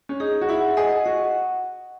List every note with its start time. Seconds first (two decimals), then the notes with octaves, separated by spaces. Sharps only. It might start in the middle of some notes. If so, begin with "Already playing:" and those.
0.09 C#4
0.20 D#4 G#4
0.41 F#4
0.49 E4 F#5
0.77 G#4 D#5
1.05 F#4 F#5